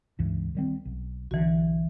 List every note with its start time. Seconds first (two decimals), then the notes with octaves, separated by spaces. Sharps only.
0.19 C#2 G2 E3
0.55 D#3 G3 C4
0.85 B1
1.31 B1 D3 E3 F#4